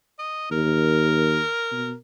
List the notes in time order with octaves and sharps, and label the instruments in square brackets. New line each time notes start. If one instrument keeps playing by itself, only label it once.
[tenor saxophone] D#5
[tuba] D#2 [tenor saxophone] A#4
[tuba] B2